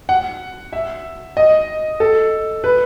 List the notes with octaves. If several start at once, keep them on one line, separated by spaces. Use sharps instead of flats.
F#5
E5
D#5
A4
B4